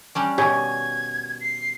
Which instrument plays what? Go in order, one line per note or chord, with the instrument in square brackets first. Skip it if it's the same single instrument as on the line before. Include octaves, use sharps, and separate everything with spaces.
[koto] G3 C#4 D4
[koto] B2 D#3 [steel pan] G4 C#5 G#5 [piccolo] G#6
[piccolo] C7